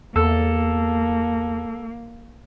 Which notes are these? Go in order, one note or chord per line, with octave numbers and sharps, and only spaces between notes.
E2 A#3 A4